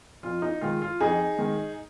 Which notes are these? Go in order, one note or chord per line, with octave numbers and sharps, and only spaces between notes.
F2 F4
D#4
D#3 G#3 F4
F4
F2 D#4 G#4
D#3 G#3